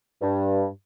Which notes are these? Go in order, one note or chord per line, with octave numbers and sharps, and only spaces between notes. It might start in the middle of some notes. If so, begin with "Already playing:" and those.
G2